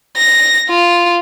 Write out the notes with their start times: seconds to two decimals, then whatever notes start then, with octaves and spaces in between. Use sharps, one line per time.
0.17 A#6
0.70 F4